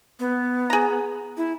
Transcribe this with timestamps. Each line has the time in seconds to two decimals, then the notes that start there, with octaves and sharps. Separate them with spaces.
0.19 B3
0.70 G#4 A#5
1.37 E4